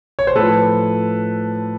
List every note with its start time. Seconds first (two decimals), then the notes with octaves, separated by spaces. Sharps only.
0.19 C#5
0.27 C5
0.35 A2 F3 A4 B4